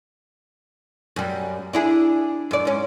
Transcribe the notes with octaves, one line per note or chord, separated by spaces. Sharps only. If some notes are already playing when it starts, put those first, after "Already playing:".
F#2 G3
D4 E4 G#4
F#2 D5
G#2 C#4